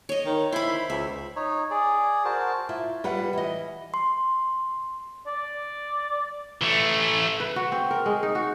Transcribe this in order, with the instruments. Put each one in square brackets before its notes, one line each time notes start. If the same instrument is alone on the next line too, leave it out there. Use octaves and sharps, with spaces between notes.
[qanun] C#5 D#5
[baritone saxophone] D#3
[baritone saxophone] E4 [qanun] C5 B5
[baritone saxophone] C#2 [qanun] E5
[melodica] D#4 C#5
G#4 D5
F#4 A#4 C5 A5
[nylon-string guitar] E4 F4
[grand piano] G3 B4 F#5 [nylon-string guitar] F4
[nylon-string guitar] E3 D#5
[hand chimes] C6
[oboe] D5
[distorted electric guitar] E3 A3
[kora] B4
F#4
C4
A#4
G#3
D#4
F#4